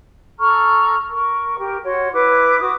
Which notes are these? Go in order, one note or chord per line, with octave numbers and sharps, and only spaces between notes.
A4 A#5 C#6 F6
A#4 C#6
G4 A#4
F#4 C#5 F#5 C6
E4 B4 D6
F#4 D6 D#6